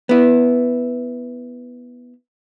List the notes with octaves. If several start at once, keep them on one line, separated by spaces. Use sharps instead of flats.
B3 E4